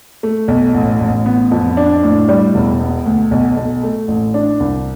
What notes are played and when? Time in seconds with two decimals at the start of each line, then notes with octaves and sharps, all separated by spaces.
0.23 A3
0.48 B1
0.74 A1
1.00 A1
1.26 B3
1.51 F2
1.77 D4
2.04 A2
2.29 G3
2.54 E1
2.81 B3
3.06 D2
3.31 B1
3.57 B1
3.83 A3
4.08 A1
4.34 D4
4.60 C2